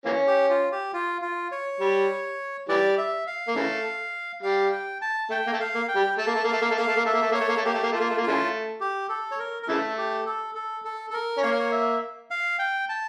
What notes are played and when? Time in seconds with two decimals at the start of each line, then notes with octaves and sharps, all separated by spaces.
0.06 E3 A#3 C#4
0.27 G4
0.50 F4
0.72 G4
0.93 F4
1.22 F4
1.52 C#5
1.80 G3
2.69 E3 G3 D5
2.98 E5
3.27 F5
3.48 A#3
3.56 C#3 E3 A3
4.43 G3 F5
4.72 G5
5.01 A5
5.30 A3 G5
5.47 A#3
5.52 A3
5.60 F5
5.75 A#3
5.88 G5
5.96 G3
6.18 A3 A5
6.27 A#3
6.35 A3
6.44 A#3
6.48 A3 F5
6.62 A#3
6.71 A3
6.77 A#3 F5
6.87 A3
6.96 A#3
7.05 A3 E5
7.13 A#3
7.22 A3
7.31 A#3 C#5
7.40 A3
7.49 A#3
7.57 A3
7.64 A#3 G4
7.74 A3
7.83 A#3
7.92 A3 F4
8.00 A#3
8.10 A3
8.18 A#3
8.23 C#3 E3 A3 F4
8.81 G4
9.09 A4
9.31 C#5
9.39 A#4
9.63 A#4
9.67 C#3 E3 A3 A4
9.98 G4
10.26 A4
10.55 A4
10.85 A4
11.10 A4
11.14 A#4
11.38 C#4
11.42 A#3 C#5
11.51 A#4
11.59 C#5
11.72 E5
12.31 F5
12.59 G5
12.89 A5